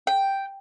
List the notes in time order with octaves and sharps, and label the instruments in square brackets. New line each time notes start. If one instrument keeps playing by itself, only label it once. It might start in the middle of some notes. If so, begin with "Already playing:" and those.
[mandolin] G5